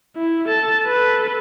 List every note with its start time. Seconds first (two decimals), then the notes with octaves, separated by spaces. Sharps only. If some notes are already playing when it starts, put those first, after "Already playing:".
0.16 E4
0.48 A4 A5
0.87 A4 B4